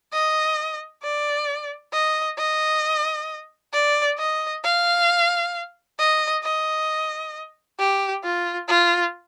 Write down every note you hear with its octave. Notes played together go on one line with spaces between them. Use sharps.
D#5
D5
D#5
D#5
D5
D#5
F5
D#5
D#5
G4
F4
F4